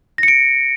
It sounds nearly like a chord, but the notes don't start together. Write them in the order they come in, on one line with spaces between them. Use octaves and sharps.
A#6 C#7 D7